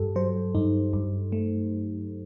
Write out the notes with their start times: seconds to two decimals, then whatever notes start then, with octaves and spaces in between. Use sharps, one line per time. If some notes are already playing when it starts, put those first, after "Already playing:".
Already playing: G2 G4 A4
0.16 F#3 C5
0.55 G2 D#4
0.93 G2
1.32 A3